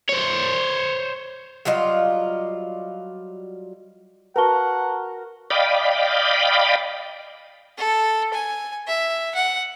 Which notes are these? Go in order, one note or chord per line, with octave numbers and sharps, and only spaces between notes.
C5 C#5
F#3 G3 F4 D#5
F#4 A#4 B4 F#5 A5 G7
D5 D#5 F5 G5 B5
A4
G#5
E5
F#5